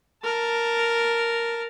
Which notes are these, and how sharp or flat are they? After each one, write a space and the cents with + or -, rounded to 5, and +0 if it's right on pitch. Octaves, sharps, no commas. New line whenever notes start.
A#4 +0 A5 +5